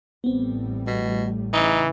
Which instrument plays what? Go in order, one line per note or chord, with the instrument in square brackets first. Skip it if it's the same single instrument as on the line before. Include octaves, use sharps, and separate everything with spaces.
[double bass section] A1 A2 G3 [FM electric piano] B3 C4
[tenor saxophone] B2 [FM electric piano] A3
[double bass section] C#3 [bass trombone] E3 [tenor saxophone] D#4